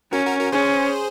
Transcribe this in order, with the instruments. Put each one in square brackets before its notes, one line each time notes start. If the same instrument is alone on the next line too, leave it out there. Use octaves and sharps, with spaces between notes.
[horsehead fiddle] C#4 [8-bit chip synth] F#4 A#4
[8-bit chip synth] F#4 A#4
F#4 A#4
[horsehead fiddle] C#4 [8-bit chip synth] G#4 C5